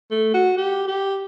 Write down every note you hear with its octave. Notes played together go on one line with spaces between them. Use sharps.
A3
F#4
G4
G4